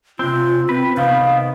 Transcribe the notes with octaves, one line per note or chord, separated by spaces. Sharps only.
C3 C4 F4
C4 B4
C3 D#3 B3 F5